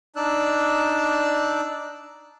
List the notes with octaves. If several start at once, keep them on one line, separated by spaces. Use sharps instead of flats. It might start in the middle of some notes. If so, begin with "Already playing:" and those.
D4 D#4 D5 E6 F#6